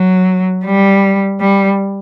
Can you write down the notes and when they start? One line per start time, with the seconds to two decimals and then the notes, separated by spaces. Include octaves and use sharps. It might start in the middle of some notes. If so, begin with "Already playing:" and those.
Already playing: F#3
0.65 G3
1.40 G3